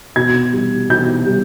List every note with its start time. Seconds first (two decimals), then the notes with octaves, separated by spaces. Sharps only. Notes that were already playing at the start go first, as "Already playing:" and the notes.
0.16 B2 G#6
0.53 G3
0.89 B2 G6
1.26 G3